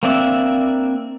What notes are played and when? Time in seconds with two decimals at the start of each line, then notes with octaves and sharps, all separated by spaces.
0.03 A#3 C4 D4 D5 E5